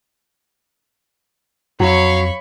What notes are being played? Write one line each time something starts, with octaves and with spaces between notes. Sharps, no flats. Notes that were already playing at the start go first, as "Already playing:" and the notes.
F2 F#3 C#5 F5 B5 C#6